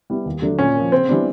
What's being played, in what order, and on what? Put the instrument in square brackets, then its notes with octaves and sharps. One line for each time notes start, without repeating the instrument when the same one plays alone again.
[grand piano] G3 B3 E4
D#2
D3 F#3 A3 D4
[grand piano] A#2 [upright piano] C#4
[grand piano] F3 A#3
[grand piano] C#3 [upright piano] C4
[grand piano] E3 G3 B3 D4